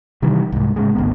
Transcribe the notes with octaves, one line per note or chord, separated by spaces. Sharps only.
C3 D#3 E3 G3
C2 G#2
A2 C#3 G#3
G#1 D2 B3